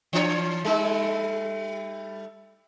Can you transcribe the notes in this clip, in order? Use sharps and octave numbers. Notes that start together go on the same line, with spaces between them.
E3 D4 C#5
G3 A3 D#4